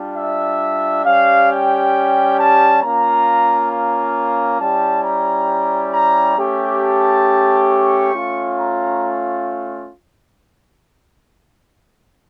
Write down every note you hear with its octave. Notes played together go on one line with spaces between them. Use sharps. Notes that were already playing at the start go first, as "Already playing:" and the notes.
Already playing: G3 D4 F4
E5
G3 C#4 G4 F5
G5
A5
A#3 C#4 F4 A#5
A#5
G3 C#4 E4 G4 A5
A#5
A#5
A3 C#4 G4
A5
C#6
A3 C#4 F4
A#5